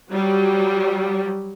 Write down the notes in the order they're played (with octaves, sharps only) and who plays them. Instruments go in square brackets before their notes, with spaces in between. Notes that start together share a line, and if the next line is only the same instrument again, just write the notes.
[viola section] F#3 G3